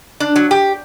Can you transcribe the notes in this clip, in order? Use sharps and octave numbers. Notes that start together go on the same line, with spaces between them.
D4
F#3
G4